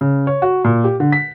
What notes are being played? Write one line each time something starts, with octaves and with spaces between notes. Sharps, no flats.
C#3
C#5
F#4
A#2
G4
D3
B6